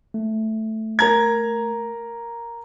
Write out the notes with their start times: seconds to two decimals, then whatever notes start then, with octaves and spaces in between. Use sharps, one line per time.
0.14 A3
0.99 A#4 A#5 G#6